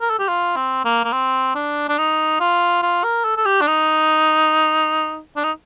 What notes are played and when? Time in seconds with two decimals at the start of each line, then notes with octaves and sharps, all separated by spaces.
0.01 A#4
0.10 A4
0.19 G4
0.29 F4
0.56 C4
0.85 A#3
1.04 A#3
1.13 C4
1.55 D4
1.89 D4
1.98 D#4
2.40 F4
2.83 F4
3.04 A#4
3.24 A4
3.37 A4
3.46 G4
3.61 D4
3.67 D#4
5.36 D4
5.44 D#4